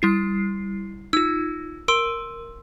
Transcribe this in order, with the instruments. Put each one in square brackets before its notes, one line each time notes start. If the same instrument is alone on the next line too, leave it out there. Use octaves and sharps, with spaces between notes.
[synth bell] G3 E4 C7
[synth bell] D#4 F4 [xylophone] E6
[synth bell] A#4 [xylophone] C6 E6 D7